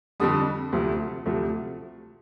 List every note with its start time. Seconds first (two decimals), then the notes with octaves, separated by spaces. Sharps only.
0.20 F2 D3 G3 D#6
0.73 D2 C3 F3 A3
1.26 D2 C3 F3 A3